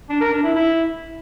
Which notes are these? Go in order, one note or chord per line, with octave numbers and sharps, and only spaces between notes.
D4
A#4
D4
E4
E4